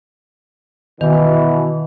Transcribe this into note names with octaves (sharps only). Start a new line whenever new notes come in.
B2 D#3 E3